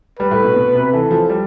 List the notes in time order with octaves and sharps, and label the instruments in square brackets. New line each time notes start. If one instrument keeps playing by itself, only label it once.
[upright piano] G3 [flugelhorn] B4
[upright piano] A2
B2
B2
C3
[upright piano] E3 [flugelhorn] A4
[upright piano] F3
G3